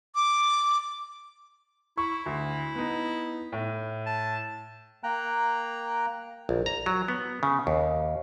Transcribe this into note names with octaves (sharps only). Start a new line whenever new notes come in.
D6
E4 C#6
D2
B3 D#4
A2
A5
A#3 G5 A#5 F#6
A#1
A#5
F#3
B3
C#3
D#2